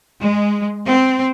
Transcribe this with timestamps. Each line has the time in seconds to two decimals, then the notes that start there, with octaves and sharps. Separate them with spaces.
0.21 G#3
0.86 C4